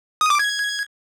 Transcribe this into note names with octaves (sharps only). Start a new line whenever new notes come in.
D#6
D6
G#6